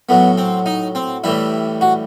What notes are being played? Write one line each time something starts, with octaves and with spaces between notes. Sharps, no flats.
A2 F#3 B3
C4
D#4
C4
A2 E3 G3 E4
F#4